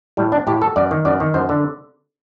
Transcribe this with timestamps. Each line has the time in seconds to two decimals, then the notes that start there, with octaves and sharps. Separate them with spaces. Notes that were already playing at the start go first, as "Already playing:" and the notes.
0.17 A2 G3
0.32 D4
0.47 A2 G4
0.62 A4
0.76 F#2 D5
0.91 D#3
1.05 F#2 D5
1.20 D#3
1.34 F#2 C5
1.49 D3